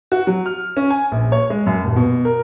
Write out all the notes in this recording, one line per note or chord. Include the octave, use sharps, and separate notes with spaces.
F#4
F#3
F6
C#4
G#5
A#1
C#5
G#3
F#2
D#1
B2
A#4